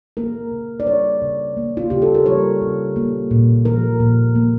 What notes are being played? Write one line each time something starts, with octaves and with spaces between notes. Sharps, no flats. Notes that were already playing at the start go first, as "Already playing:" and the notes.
A#3 A#4
C#3
D5
G3 C#5
C#3
A#3
F4
C#3 G4
A4
A#4
G3 C#5
C#3
A#3
A#2
F3 A#4
A#2
A#3